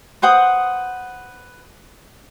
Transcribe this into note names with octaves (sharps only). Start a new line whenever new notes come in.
B4 C5 F#5 D#6